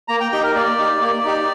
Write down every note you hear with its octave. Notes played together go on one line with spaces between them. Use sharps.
A#3 A#5
G5
D#4 G4 G5
A#4
A#3 D5
D#4 G4
A#3
D#4 G4